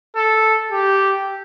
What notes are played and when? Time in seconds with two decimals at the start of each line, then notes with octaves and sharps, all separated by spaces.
0.16 A4
0.71 G4